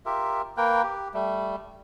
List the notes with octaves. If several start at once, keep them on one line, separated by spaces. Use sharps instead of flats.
F4 G4 A#4 E5
A#3 A#4 B4 G5
G4
G3 A3